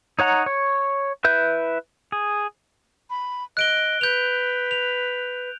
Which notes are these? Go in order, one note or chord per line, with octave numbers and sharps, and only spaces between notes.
D#4 C#5 F#5 A#5
C#5
E4 B4 E5 G6
G#4
B5
D#5 F#6 D7 G7
B4 G6 F7
F7